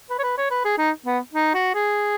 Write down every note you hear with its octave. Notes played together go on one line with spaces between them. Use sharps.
B4
C#5
B4
C#5
B4
G#4
D#4
B3
D#4
F#4
G#4